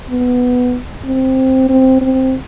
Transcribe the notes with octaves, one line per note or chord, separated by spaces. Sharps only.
B3
C4
C4
C4